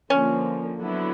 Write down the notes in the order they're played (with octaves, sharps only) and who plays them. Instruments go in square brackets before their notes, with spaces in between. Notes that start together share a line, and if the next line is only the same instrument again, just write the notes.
[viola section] D3 F3 A#3 [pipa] C#4
[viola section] D3 F#3 B3 E4